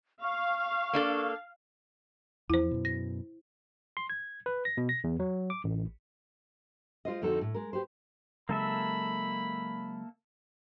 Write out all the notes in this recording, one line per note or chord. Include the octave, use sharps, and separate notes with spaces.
F5 C#6
A#3 D4 A4
E2 F3 E4 C5
F#2 B2
A#6
C6
G#6
B4
A#6
B2
A#6
E2
F#3
D6
A1
G#3 F4 C5 D#5
F2 D3 C4 D#4 F#4 A4
A2
G#3 A#4
G4 B4 C5
C#3 F#3 G#3 A#3 A4 E5 B5